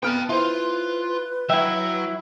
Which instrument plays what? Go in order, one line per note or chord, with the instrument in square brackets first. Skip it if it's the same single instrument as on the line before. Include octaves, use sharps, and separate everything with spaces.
[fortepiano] B3 F6 [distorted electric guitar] G5 A5
[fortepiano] E4 C5 [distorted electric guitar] F4 [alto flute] B4
[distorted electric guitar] F#3 [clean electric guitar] E4 E5 [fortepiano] G5